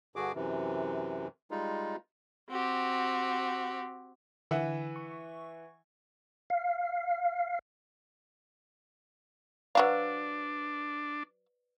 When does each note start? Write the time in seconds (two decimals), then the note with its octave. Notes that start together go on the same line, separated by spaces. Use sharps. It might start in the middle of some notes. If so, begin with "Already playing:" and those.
0.16 G2 D3 F#4 G#4 D6
0.35 F#2 C3 E3
1.51 G3 G#3 D#4 F4
2.49 C4 F#4 G4
4.51 D3 E3 E5 F#5
4.96 C#6
6.50 F5
9.75 F#3 D4 F#4 B4 C5 D5 F5